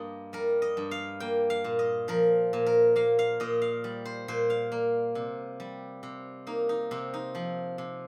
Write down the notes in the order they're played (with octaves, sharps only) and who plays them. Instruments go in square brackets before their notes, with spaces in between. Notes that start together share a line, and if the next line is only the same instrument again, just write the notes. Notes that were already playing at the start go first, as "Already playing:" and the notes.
Already playing: [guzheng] G2 A#3 D#5
G3 A#4
D#5
G2
F5
A#3 G5
F5
A#2
D#5
F3 A#4
A#2
A#4
A#3 F5
F5
A#2 D#5
F5
G3
C5
A#2 C5
F5
A#3
C3
G3
C3
A#3 D#4
D#4
C3 C4
D#4
F3
C3